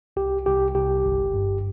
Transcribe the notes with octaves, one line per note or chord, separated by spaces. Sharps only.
C2 G4
C2 G4
C2 G4
G1
G2